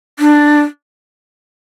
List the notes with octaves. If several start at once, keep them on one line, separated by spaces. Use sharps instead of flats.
D4